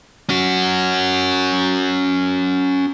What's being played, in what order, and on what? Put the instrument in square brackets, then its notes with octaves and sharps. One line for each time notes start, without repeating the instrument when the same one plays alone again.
[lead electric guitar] C#4 F#4